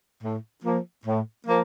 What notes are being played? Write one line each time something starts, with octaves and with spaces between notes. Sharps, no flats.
A2
F3 A#3
A2
F3 A#3